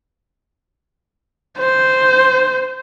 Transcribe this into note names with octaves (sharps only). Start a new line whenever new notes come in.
C5